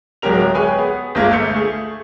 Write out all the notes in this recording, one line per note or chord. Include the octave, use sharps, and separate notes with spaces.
D1 F#3 G#3 G4 A#4 F7
G#4 B4 C#5 G5 G#5
B3 G#4
G1 G#3 A#3 F4 A#4 G#6
G1 A3 F5 G6 C#7
A3 G#4